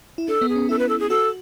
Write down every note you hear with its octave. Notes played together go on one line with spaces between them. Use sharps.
E4
D4 A4
B3
G#4
C#4
E4 A4
B4
A4
G#4
F#4 A4